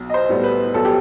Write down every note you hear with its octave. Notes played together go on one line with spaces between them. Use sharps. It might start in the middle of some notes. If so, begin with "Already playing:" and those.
Already playing: B1
D#5
C5
A2 G3 B3
B4
B1 A4
G4